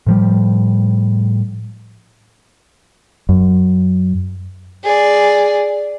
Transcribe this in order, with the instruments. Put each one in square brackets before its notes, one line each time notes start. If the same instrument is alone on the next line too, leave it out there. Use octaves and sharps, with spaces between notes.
[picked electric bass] A2 F3 G3
[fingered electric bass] F#2
[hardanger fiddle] G#4 D5